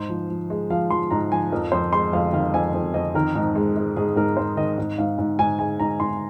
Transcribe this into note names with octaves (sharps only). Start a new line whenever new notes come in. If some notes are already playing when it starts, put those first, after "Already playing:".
Already playing: G#2 C5
F3
F3
G#3
F3 F5
F3 C6
G#2 A#5
F3 G#5
F2 A#4
F2 C5
G#3 C6
F2 F5
D#3 F5
F2 G#5
F2
F2 D#5
D#3 A#4
G#2
G#3
G#3
G#2 G#4
G#2 A#4
G#3 C5
D#3 D#5
G#2
G#2 F5
G#2
G#2 G#5
G#3 G#5
G#2 A#5
G#2 C6